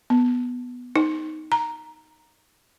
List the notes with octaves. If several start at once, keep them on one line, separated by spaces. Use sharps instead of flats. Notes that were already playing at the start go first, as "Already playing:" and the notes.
B3
D#4
A#5